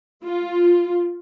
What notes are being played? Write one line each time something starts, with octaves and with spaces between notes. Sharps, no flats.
F4